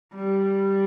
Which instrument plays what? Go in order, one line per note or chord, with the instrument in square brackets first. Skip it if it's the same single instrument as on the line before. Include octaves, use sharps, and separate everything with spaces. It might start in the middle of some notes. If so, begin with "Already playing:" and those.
[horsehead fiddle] G3